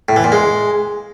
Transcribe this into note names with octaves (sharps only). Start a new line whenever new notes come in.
A2
E3
A#2
G#3